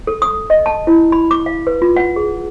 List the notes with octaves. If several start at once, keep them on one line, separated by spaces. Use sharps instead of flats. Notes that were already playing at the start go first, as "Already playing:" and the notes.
A4
D#6
D#5
A5
E4
B5
D6
F5
B4
F4
F#5
G#4